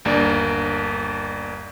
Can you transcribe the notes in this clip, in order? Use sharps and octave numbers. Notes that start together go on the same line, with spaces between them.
G1 D#2 A#3 D4 D5